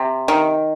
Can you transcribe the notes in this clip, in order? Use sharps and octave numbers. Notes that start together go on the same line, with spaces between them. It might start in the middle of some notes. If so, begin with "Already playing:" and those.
Already playing: C3
D#3